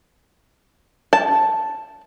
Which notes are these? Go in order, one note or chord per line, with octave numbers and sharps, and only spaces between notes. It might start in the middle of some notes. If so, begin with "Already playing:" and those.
A5